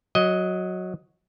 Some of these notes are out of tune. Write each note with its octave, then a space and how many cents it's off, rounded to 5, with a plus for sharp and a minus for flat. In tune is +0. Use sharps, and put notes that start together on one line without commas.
F#3 -10 D#5 +10